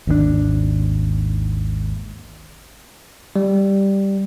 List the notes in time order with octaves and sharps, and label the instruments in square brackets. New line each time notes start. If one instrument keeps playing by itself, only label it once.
[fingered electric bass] G#1 D#2 D3 D4
[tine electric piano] G3